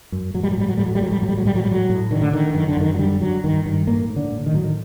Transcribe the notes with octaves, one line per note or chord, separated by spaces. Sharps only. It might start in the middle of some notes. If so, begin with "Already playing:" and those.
F#2
A2 F#3
G3
F#3
A2 G3
F#3
A2 G3
F#3
G3
A2 F#3
G3
A2 F#3
G3
F#3
A2 G3
F#3
G3
A2 F#3
A2
D3 D#3
D3
D3 D#3
F#2 D#3
D3
F#2 D#3
F#3
D3 G3
D3 F#3
G2 D#3
G2 D#3
A2 A#3
A2
D3
A2
D#3
A2 F#3
D#3